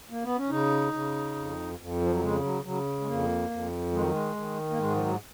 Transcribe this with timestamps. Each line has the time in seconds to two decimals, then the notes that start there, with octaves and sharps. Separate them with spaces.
0.10 A#3
0.23 B3
0.37 C#4
0.50 C#3 D#4
0.93 C#3
1.36 F2
1.79 F2
2.01 F3
2.11 F#3
2.21 C#3 G#3
2.43 F#3
2.64 C#3 F#3
3.01 G#3
3.07 F2 A#3
3.50 F2
3.92 D#3 G#3
4.02 F#3
4.11 G#3
4.36 D#3
4.71 A#3
4.78 G#2 G#3
4.95 F3
5.00 F#3